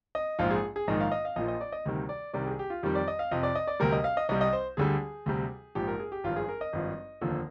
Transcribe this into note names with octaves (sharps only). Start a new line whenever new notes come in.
D#5
A#1 G#2 F3 F4
G#4
G#4
A#1 G#2 D#3 D#5
F5
D#5
F5
A#1 A#2 F3 D#5
D#5
D5
D#5
D2 C3 D#3 G3
D5
C2 C3 D#3 G3 D5
G#4
G4
F4
F2 D#3 G3 G4
D5
D#5
F5
F2 C3 F3 D#5
D5
D#5
D5
D2 C3 G3 A#4
D#5
F5
D#5
C2 C3 G3 D#5
D#5
C5
D2 D3 G3 G#4
D2 C3 G3
A#1 G#2 F3 G4
A#4
G#4
G4
G#1 G2 F3 F4
G#4
A#4
D#5
G#1 G2 F3
F1 D#2 D3 F3